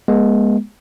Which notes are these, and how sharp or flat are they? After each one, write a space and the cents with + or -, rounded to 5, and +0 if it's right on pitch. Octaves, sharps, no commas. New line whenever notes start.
G#3 +0 B3 -40